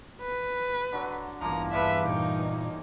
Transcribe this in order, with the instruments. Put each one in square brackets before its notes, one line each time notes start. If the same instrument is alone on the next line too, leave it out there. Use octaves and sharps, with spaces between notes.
[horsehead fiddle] B4
[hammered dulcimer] D3 F#3
[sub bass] A1 [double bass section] E2 G2 E3 [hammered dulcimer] F3 A#3 [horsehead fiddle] A#5
[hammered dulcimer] D3 F3 A#3 [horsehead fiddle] B4 E5
[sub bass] A#2 [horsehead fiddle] D#4 [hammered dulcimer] C#5 G5